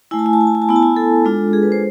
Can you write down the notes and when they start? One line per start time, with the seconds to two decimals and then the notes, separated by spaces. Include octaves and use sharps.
0.11 A3 E4 G#5
0.19 A5
0.26 G#5
0.33 A5
0.41 G#5
0.47 A5
0.55 G#5
0.62 A5
0.69 B3 E4 G#5
0.76 A5
0.83 G#5
0.96 A4
1.25 G#3 D4 F4
1.53 G#4
1.63 B4
1.72 C5